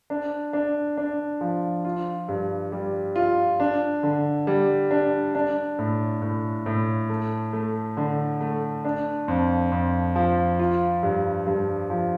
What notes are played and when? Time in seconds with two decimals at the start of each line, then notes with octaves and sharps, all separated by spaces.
0.10 D4
0.53 D4
0.97 D4
1.41 F3
1.85 F4
2.29 G2
2.72 G3
3.16 F4
3.60 D4
4.03 D3
4.47 G3
4.91 D4
5.35 D4
5.79 A2
6.22 A2
6.66 A2
7.09 A3
7.53 A3
7.97 D3
8.41 A3
8.85 D4
9.28 F2
9.72 F2
10.16 F3
10.59 F4
11.03 G2
11.47 G2
11.90 F3